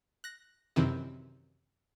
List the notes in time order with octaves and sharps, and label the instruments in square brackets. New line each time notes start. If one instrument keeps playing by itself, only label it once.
[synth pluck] F#6 A#6
F#2 C3 D#3 E3 C4